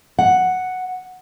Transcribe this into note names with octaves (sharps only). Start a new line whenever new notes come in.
F#5